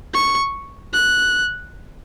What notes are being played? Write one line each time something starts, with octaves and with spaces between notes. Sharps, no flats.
C#6
F#6